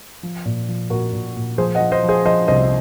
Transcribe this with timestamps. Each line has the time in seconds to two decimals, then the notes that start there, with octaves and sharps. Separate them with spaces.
0.23 F3
0.45 A#2
0.68 F3
0.90 A#2 F#4 A#4
1.13 A#2
1.36 A#2
1.58 F3 G#4 C5
1.75 D#5 F#5
1.80 F3
1.92 C5 D#5
2.04 F3
2.09 G#4 C5
2.25 F3 C5 D#5
2.48 C2 C5 D#5
2.63 D#5